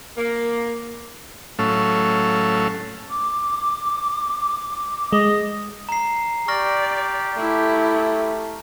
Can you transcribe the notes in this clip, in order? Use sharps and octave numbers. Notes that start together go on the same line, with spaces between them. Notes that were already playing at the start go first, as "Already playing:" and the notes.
A#3
A2 F#3 A3 C#4 A4 F5
D6
G#3 D#5
A#5 C7
G4 D5 C#6 F6 A#6
A3 E4